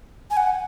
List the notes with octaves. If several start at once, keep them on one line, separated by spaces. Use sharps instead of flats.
G#5
F#5